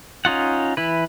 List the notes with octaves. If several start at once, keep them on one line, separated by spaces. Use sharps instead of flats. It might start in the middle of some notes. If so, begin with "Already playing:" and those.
C#4 D#4 F4 F#5
E3 E4 B4